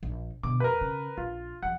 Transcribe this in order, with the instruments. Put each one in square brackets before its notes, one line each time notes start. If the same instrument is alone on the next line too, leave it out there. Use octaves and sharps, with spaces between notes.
[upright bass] A#1 D#4
[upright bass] B2 D3 [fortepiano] D6
[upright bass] F2 [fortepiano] A#4 B4
[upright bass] C#3
[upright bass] A#1 [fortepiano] F4
[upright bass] E2 F3 [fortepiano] F#5